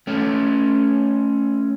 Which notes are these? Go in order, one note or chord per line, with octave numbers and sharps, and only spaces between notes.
A3 C#4